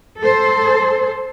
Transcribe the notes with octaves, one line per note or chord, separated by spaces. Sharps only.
A4 C5